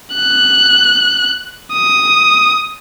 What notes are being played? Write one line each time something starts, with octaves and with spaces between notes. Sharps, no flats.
F#6
D#6